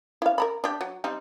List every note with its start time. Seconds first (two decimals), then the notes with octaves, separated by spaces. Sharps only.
0.22 E4 F5
0.38 A#4 A#5 B5
0.64 D4 G4
0.81 F#3
1.04 G3 C4 D#4